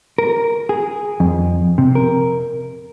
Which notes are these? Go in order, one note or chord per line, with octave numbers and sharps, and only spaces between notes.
A#4
G#4
F2
C3
A#4